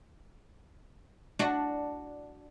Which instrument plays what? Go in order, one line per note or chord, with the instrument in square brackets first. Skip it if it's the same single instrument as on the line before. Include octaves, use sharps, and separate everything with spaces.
[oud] D4 F#4